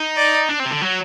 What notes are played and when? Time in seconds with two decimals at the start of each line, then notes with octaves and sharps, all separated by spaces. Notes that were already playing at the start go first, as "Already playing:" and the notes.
Already playing: D#4
0.17 D5
0.49 D4
0.60 C4
0.65 C3
0.71 D3
0.81 F#3